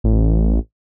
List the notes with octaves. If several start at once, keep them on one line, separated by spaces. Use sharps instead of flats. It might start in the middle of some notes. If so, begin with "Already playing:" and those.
A1